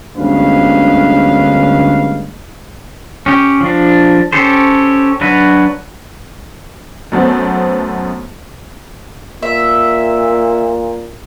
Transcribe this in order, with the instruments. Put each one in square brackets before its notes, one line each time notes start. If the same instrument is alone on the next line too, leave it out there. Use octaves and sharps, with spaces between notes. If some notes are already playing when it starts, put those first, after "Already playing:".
[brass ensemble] G1 D2 G#3 C#4 B4 F5
[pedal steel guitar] C#4 G4
F3 D4
C#4 G4 A4 C5
F#3 D4 F#4 B4
[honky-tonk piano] F#2 A3 B3 C4
[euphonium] A#2 [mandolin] E5